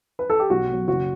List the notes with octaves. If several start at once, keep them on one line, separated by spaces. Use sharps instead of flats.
B4
A4
G4
B1 F#4
B2 F#3
F#1 F#4